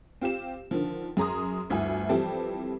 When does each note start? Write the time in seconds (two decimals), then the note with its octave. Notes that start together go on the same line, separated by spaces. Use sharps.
0.21 C4 F4 G4 E7
0.71 D3 D#3 F3
1.17 F#2 G#4 A#5 C6 D#6
1.70 G1 D2 E4 E5 G#5
2.09 E3 F3 G3 C4 G4 A4